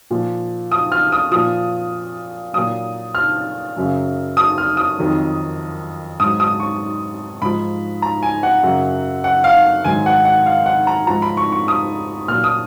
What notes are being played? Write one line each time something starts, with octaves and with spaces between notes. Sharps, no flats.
A#2 F3
D#6
F6
D#6
A#2 F3 D#6
A#2 F#3 D#6
F6
F#2 C#3 F#3
D#6
F6
D#6
F2 D#3 F#3
G#2 F#3 D#6
D#6
C#6
G#2 F3 B5
A#5
G#5
F#5
F#2 C#3 F#3
F#5
F5
G#2 D#3 F#3 G#5
F#5
F#5
F5
F#5
A#5
G#2 F3 A#5
B5
C#6
C#6
D#6
A#2 F#3 F6
D#6